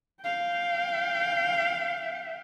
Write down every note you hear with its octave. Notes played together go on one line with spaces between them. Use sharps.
F5 G5